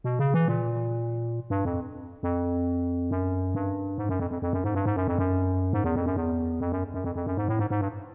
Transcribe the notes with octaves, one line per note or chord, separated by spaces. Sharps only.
B2
C#3
E3
A#2
G2
F2
F2
F#2
G2
G#2
F#2
F2
F2
F2
F#2
G#2
G2
G#2
F#2
F2
F#2
G#2
E2
F2
F#2
E2
F2
F#2
F#2
F2
F2
F#2
G#2
A2
G#2
G#2
G2